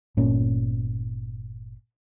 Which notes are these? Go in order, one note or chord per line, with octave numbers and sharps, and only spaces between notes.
G1 A#2 C#4